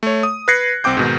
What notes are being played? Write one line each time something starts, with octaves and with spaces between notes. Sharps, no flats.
A3 C#5
D#6
B4 F#6 G#6 A#6 C7 C#7
C2 C4 G5 D6 G6
G#2 B2 D#3